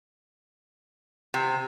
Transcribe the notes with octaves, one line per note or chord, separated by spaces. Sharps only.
C3